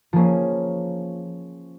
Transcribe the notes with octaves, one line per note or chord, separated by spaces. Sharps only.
F3 A#3 C#4 G#4